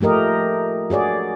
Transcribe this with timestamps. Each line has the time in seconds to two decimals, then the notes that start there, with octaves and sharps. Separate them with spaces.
0.01 F3 A3 G4 A#4 D#5
0.90 F#4 G#4 C#5 D5